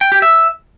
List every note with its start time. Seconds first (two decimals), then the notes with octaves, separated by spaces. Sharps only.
0.01 G5
0.12 G4
0.22 E5